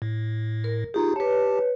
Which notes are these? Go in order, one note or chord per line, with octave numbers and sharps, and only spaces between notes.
A2
A#4
D#4 F4 G4 G#4 A#5
G4 B4 C#5 A5